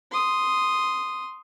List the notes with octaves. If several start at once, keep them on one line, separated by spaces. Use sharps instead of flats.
C6 D#6